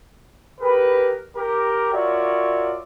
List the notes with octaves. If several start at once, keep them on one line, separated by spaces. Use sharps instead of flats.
G4 G#4 A#4 B4
G4 A#4
F4 F#4 A#4 C#5 D5 E5